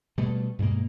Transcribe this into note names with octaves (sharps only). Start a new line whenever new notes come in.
B2 G3 A3
G2 B2 G#3 A#3